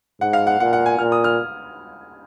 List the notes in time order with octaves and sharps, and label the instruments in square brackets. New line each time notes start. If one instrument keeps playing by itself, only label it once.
[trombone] G#2 [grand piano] F#5
[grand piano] F5
F#5
[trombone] A#2 [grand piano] F#5
[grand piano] F#5
G#5
[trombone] A#2 [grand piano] F6
[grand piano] D#6
F6